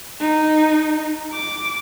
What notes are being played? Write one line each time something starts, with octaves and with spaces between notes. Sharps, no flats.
D#4
D6